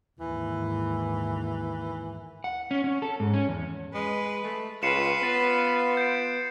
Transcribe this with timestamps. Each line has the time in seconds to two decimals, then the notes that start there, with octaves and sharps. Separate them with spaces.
0.20 D#2 G#2 E3
2.44 F#5
2.71 C#4
2.84 C#4
3.02 A4
3.20 G#2
3.34 C#4
3.49 E2
3.94 G#3 B4
4.44 A3
4.83 C#2 F4 B4 C7 C#7 E7
5.23 B3 A6
5.97 G6 C7 D7